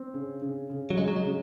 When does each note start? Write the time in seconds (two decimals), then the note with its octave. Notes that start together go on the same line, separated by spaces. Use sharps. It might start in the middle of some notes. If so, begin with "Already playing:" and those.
Already playing: C4
0.14 C#3
0.42 C#3
0.70 C#3
0.90 F#3
0.98 C#3 G#3
1.08 F#3
1.16 G#3
1.26 C#3